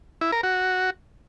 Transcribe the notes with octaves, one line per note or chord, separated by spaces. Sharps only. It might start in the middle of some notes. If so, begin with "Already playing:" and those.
E4
A#4
F#4